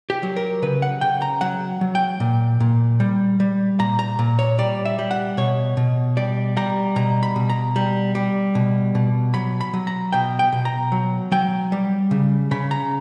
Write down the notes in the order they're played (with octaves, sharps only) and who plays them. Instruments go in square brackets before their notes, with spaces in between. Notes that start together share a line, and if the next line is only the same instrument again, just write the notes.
[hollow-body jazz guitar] G4
F#3
A#4
C#3 B4
F#5
C#3 G5
A#5
F#3 F#5
F#3
G5
A#2
A#2
G3
G3
A#2 A#5
A#5
A#2 A#5
C#5
G3 D5
E5
G3
F#5
B2 C#5
B2
G3 D5
G3 A#5
B2 A#5
B5
B2
A#5
G3
G3
B2
B2
F#3 B5
B5
F#3
A#5
B2 G5
G5
B2
A#5
F#3
F#3 G5
G3
C#3
C#3 B5
A#5